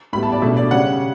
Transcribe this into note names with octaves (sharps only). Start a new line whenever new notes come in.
A2 G3 B3 B5
A5
D5
B2 A3 D4 E5
D5
C#3 G3 C#4 F#5